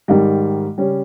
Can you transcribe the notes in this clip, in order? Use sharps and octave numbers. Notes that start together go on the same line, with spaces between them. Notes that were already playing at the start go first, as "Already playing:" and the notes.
G#2 D#3 G3
C#3 G3 C#4